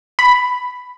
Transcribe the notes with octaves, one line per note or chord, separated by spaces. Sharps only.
B5